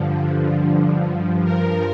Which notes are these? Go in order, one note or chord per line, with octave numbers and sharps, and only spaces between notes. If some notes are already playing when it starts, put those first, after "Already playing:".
Already playing: G2 D3 F3
G2 F3
A#4